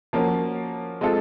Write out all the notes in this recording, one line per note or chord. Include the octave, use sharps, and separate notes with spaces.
F3 A#3 C#4 F#4
G#3 C4 F4 A4